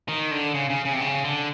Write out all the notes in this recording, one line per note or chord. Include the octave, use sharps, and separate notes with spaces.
D#3
D3
C#3
C#3
C#3
C3
C#3
D3